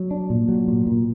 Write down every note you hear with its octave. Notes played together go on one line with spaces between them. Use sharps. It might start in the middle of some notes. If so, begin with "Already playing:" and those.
Already playing: F#3
D4
A#2
F#3
A#2
A#2